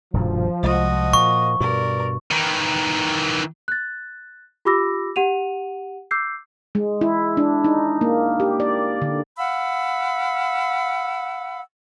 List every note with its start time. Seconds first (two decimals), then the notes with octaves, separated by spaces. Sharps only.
0.13 D#1 G2 B2 F3
0.63 C2 G#3 F#4 D#5
1.13 A#2 C#6
1.60 G2 B2 A#4 D5
2.31 D#3 E3
3.68 F#6 A6
4.65 F4 G4 B5 D6 E6 A#6
5.16 G4 F#5 D#7 F7
6.11 D6 E6 G6 C7
6.75 G#3
7.01 E4
7.37 D4
7.65 D#4
8.01 A#3
8.40 G4
8.60 D5
9.02 D3
9.37 F5 F#5 B5 E6